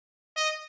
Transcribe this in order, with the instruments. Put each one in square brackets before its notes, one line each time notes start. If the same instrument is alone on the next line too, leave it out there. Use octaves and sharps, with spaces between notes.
[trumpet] D#5